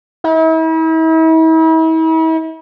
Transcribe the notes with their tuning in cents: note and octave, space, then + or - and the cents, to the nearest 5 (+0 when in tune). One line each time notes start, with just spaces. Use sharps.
E4 -40